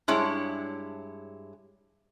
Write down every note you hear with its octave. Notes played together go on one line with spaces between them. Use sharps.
G2 G#3 E4 C#5